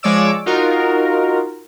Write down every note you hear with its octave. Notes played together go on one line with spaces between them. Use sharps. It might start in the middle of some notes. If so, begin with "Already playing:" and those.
F3 G#3 C#5 D5 D6 E6
D#4 F4 F#4 A#4